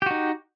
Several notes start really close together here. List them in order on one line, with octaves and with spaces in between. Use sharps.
G4 F#4 D#4